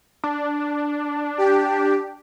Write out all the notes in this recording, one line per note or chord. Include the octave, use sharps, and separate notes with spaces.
D4
G4